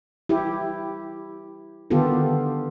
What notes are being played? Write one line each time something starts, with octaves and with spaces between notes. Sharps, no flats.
E4 G4
D3 D#3 B3 F4 G4 A4